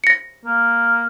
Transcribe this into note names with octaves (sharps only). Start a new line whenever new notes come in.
A#6 C#7
A#3